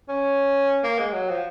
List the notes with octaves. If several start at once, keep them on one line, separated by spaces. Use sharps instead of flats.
C#4
A#3
G#3
F#3
F3